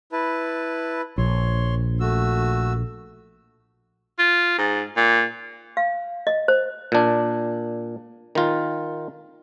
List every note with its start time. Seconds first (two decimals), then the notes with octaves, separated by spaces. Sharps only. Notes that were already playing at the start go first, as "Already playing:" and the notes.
0.12 E4 B4 A5
1.18 A#1 C#5 C6
2.00 A3 F#4 E6
4.19 F4
4.58 G#2
4.97 A#2
5.77 F5
6.27 D#5
6.48 C5
6.92 A#2 D4
8.35 D#3 F4